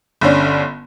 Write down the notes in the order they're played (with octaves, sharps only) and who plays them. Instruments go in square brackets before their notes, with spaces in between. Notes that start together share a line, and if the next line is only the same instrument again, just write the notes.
[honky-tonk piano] G1 D3 C#4 D4